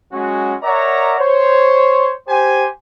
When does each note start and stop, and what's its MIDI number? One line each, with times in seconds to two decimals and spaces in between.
0.12 0.54 54
0.12 0.54 56
0.12 0.54 61
0.12 0.54 66
0.63 1.14 70
0.63 1.14 73
0.63 1.14 74
0.63 1.14 76
0.63 1.14 78
0.63 1.14 82
1.19 2.12 72
1.19 2.12 73
2.28 2.66 67
2.28 2.66 72
2.28 2.66 80